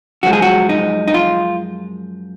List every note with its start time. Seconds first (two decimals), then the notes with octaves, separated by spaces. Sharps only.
0.23 F#2 F3 G#3 F#4
0.33 G#4
0.42 F#4
0.69 D#4
1.08 D#4
1.14 F4